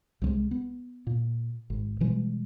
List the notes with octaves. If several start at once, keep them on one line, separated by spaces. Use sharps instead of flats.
C2 C3 F#3 G#3
B3
A#2
G#1
B2 E3 G3 G#3